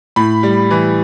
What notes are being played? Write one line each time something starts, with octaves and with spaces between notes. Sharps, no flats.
A2 B5
G3
E3